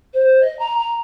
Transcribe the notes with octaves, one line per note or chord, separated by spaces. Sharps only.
C5
D#5
A#5
A#5